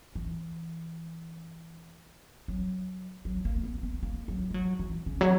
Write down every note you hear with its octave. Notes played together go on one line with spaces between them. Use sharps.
E3
F#3
F#3
A#3
B3
B3
A#3
F#3
G#3
F#3
E3
C#3
F#3